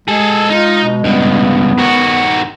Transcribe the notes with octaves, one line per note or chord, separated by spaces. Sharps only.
G#3 G#4 A4
D#4 F4
B2
C#2 G2 B3
D#3 F#4